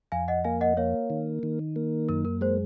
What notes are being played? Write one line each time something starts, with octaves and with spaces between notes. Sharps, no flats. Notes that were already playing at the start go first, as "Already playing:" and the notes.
F2 F5 G#5
D#5 F#5
A#3 F5 G#5
D#5 F#5
A#3 C#5 F5
D#3
D#3
A#3
F#2 A#4
A#4
G#3 C5